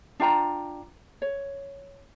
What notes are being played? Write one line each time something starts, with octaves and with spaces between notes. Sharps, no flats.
D4 F4 G5 A#5
C#5